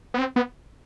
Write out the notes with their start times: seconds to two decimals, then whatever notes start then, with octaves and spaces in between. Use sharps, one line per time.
0.14 B3
0.19 C4
0.36 B3